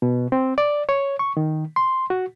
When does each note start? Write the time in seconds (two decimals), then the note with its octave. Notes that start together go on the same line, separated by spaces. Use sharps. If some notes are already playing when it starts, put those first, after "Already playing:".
0.02 B2
0.32 C4
0.58 D5
0.89 C#5
1.19 C#6
1.37 D#3
1.76 C6
2.10 F#4